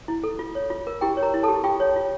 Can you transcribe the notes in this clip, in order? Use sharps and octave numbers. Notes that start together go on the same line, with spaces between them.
E4
A4
F4
C#5
F4
A#4
E4 G4 G5
C#5
A#4 A#5
E4
A4 A5
G4
F4 G4 G5
C#5
F4